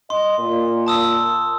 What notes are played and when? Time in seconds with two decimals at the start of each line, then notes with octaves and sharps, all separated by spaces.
0.10 D#5 C6
0.39 A#2
0.87 A5 D#6 E6